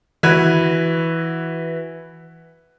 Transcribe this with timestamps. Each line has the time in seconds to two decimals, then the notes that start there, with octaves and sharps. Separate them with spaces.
0.23 E3 F#4 B4 G#6